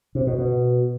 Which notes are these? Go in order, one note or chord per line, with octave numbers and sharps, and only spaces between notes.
C3
B2
B2